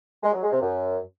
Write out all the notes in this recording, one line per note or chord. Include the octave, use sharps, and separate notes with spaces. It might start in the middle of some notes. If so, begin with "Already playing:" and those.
G#3
F#3
G#3
C3
F#2